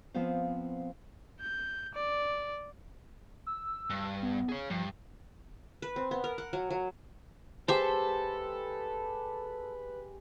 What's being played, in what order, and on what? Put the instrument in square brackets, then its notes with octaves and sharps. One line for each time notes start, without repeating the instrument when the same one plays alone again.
[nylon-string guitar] F3 B3 C4 F4 C5 F5
[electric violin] G6
D5
[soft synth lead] E6
[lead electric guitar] G2
[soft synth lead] B3
[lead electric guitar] G#4 C#5
[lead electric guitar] G2 [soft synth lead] F3
[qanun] B4
C4
B3
A#4
F#5
F#3
F#3
[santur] G#3 G4 [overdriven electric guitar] A4 [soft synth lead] B4 [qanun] C5 E5